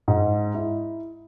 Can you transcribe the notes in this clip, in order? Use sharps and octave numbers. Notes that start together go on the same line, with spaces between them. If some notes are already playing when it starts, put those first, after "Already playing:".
G#2
E4